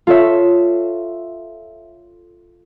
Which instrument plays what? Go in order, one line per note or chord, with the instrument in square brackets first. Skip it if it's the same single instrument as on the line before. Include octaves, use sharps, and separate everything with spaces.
[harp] F4 A4 C#5 E5